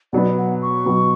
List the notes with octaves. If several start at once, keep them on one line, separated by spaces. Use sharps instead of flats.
B2 F#3 B3 D5
F#5
C#6
B2 F#3 B3